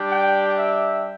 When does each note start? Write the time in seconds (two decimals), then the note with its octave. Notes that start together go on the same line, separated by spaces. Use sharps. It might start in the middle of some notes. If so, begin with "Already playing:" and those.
Already playing: G3 D4 G4
0.12 G5
0.58 E5